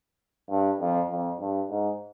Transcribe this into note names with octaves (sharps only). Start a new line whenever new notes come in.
G2
F2
F2
G2
G#2